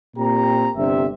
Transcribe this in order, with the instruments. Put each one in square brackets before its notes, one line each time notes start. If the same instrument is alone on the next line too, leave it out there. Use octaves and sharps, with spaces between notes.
[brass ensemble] A#2 C4 G4 A#5
G1 C3 D4 E5